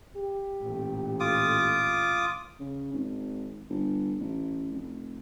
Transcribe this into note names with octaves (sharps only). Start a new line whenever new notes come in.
G4
A1 A#2
F4 D6 D#6
C#3
G#1
G1
A1
F1